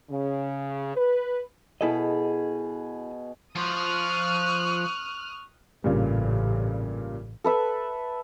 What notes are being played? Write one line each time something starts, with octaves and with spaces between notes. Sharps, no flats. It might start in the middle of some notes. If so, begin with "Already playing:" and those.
C#3
B4
B2 E4 G#4 A4 D#5 B5
F3 C5 C#6 D#6 F6 F#6
A1 G2 A#2 C#3
A4 B4 E5